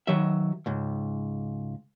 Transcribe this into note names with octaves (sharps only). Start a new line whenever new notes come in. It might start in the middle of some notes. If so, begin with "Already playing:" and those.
D#3 F#3 E5
C#2 G#2